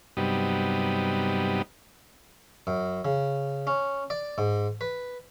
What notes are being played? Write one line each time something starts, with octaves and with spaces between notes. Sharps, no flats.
G2 C3 F#3 G3 B3 D#4
F#2
C#3
C#4
D5
G#2
B4